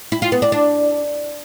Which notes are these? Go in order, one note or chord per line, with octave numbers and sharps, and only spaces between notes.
E4
F4
B3
D4
D4